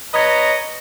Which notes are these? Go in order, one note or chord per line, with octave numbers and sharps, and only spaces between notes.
B4 C#5 D#5 A#5